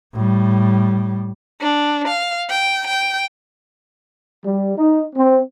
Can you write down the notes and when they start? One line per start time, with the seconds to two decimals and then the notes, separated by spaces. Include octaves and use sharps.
0.15 A2 G3
1.59 D4
2.07 F5
2.49 G5
2.87 G5
4.44 G3
4.77 D#4
5.15 C4